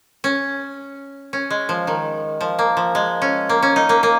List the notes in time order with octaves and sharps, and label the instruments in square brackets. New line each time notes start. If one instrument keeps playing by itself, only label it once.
[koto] C#4
C#4
G#3
F3
D#3
F3
A#3
F3
G#3
C#4
A#3
C#4
D#4
A#3
A#3